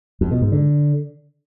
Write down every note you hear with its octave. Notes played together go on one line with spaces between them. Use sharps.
F2
B2
G#2
D3